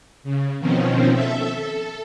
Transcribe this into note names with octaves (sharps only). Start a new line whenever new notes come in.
C#3
B2 D#3 F3 C4 C#4
A4 E5
A4